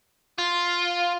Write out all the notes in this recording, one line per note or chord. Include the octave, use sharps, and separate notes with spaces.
F4